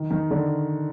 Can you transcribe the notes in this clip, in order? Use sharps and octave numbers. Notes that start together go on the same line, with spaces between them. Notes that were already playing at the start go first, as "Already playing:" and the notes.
Already playing: D#3
D#3
D3